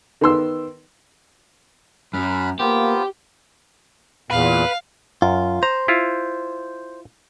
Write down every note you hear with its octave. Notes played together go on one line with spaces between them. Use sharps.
D#3 B3 C6 E6
F#2 B5 F6 F#6
A#3 B3 F4 G4 C5
E2 A#2 B4 F5
F#2 F4
C5 A#5
E4 F4